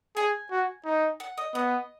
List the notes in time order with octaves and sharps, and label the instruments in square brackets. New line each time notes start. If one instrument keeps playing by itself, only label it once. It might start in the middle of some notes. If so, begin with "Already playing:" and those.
[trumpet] G#4 [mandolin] G#5
[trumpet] F#4
D#4
[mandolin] F#5
D#5
[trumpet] B3 [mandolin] D#5